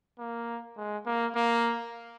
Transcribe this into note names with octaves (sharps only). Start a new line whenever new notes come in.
A#3
G#3
A#3
A#3